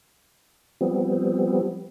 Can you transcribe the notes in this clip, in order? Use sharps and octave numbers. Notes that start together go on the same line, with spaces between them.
F3 G3 B3 C4